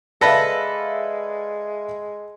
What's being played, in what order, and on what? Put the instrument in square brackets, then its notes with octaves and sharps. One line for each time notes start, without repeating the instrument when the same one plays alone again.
[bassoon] G#3 [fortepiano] A4 B4 [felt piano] D5 E5 F5 [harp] A#6